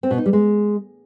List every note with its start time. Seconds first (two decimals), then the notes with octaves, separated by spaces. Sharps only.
0.03 C4
0.11 B2
0.18 D#4
0.26 G3
0.33 G#3